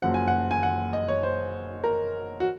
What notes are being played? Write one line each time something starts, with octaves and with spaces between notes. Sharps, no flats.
F#1 F#2 F3 F#5
G#5
F#5
G#5
F#5
D#5
C#5
C5
A#4
F#4